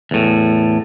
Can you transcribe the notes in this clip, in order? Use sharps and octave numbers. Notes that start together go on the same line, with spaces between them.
E2 A2